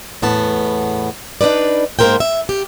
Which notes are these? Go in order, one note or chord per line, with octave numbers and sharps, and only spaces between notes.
E2 A2 B3 A5
D4 D#4 B4 D5
G#2 A#3 F#4 A#4 C5 G5
E5
G4